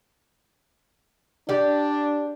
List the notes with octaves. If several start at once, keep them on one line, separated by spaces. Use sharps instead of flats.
D4 G4 D5